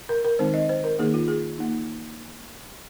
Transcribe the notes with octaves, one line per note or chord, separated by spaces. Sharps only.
A#4
A#4
D#3 G#3 C4 D#4 C5
D#5
C5
A#4
D#3 A#3 D#4 G#4
F4
G#4
A#3 D#4